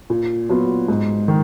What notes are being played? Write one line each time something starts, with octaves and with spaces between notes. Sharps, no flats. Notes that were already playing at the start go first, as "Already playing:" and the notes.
A#2
F#3 B3 F4
G#2
D#3